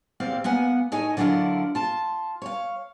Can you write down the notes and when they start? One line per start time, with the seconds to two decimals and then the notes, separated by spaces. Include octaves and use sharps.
0.20 E2 A#2 C4 G4 F5
0.44 A#3 B3 F#5 G#5
0.92 A2 D#4 C#5 D#5 G#5
1.17 D3 F#3 D4 E4 F4 A#4
1.75 F4 A5
2.42 C#5 F5